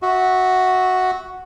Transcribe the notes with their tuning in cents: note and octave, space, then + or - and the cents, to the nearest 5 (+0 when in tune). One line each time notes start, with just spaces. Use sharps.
F#4 +0 E5 -25